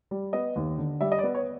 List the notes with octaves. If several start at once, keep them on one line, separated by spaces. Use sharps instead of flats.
G3
B3 D#5
D#2
D3
G3 E5
D#5
D5
B3
C#5